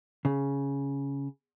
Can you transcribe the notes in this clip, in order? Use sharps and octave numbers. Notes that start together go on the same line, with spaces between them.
C#3